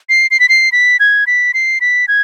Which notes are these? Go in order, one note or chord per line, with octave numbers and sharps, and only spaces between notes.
C7
C7
B6
C7
B6
G#6
B6
C7
B6
G#6